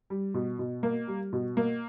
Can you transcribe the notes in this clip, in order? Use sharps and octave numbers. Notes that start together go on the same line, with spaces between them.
G3
B2
B2
A#3
G3
B2
A#3